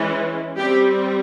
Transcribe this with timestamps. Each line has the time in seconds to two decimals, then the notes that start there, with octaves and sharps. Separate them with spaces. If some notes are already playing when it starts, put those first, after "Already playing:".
Already playing: E3 G#3 C#4
0.58 G3 C4 G4